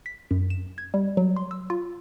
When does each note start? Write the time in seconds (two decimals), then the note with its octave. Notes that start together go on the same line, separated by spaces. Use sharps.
0.06 B6
0.31 F#2
0.50 E7
0.78 G#6
0.94 G3
1.17 F#3
1.36 C6
1.51 E6
1.70 F4